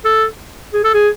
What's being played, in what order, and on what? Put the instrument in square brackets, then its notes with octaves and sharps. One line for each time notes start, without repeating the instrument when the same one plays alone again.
[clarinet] A4
G#4
A4
G#4